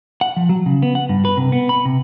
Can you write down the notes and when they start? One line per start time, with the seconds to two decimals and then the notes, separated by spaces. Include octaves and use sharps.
0.21 F#5
0.37 F3
0.49 F#3
0.66 C#3
0.82 B3
0.95 F#5
1.09 G2
1.25 B4
1.37 C3
1.52 B3
1.69 B5
1.85 C3